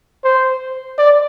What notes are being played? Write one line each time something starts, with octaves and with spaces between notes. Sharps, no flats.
C5
D5